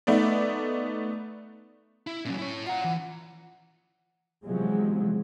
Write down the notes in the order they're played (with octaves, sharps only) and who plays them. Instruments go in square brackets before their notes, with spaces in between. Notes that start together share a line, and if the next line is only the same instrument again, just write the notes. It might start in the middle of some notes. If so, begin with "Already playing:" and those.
[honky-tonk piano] A3 B3 D#4 D5
[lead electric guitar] E4
[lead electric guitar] A#2 F#3 [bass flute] C#4
[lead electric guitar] E4 C#5
[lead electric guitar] F4 A#5 [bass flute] F#5
[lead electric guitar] E3
[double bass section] E2 C3 F3 F#3 G#3